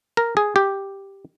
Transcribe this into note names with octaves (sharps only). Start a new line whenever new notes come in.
A#4
G#4
G4